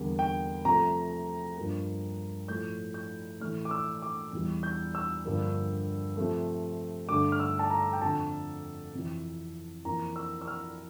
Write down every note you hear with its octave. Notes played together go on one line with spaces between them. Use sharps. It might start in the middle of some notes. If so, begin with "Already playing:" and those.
Already playing: E2 D3 G3 A#3
G5
C3 F3 A3 A#5
G2 F3 A#3
A2 F3 A3 G6
G6
A2 E3 A3 F6
D6
E6
D6
E2 E3 G3
G6
E6
G2 D3 F3 A#3
C3 F3 A3
G2 D3 A3 D6
F6
E6
A5
A#5
G5
F2 D3 A3 A5
F2 C3 E3
F2 E3 A#3 A#5
E6
E6
F6